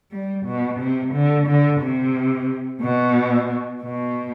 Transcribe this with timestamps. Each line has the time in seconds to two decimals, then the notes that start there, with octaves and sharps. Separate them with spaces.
0.11 G3
0.46 B2
0.79 C3
1.13 D3
1.47 D3
1.80 C3
2.82 B2
3.83 B2